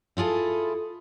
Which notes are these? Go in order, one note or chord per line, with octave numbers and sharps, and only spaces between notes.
E4 F4 G#4 A4